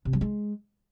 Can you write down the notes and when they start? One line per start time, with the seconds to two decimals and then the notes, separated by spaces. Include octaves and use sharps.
0.05 C3
0.13 F#3
0.21 G#3